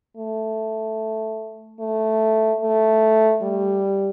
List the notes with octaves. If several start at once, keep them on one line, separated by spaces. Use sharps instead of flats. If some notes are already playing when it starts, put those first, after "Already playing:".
A3
A3
A3
G3